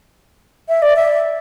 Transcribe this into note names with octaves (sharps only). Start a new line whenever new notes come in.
E5
D5
E5